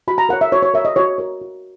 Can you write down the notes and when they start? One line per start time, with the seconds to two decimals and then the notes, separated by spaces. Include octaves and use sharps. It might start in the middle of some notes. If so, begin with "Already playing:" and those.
0.08 F#4 B5
0.18 A#5
0.29 A#4 F#5
0.33 C#5
0.41 E5
0.52 F#4 C#5
0.62 C#5
0.74 A#4 E5
0.78 C#5
0.85 D#5
0.96 F#4 C#5
1.18 A#4 C#5
1.41 F#4